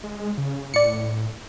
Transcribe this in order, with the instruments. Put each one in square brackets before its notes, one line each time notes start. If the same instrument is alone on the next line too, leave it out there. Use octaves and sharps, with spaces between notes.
[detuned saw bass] G#3
C#3
[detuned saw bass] A2 [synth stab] D5 C#7